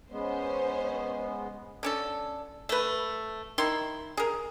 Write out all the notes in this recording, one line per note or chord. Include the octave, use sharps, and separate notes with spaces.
G#3 B3 C#4 C5
D3 C#4 A4
A3 B4
D#3 E4 C6
G#4 A#4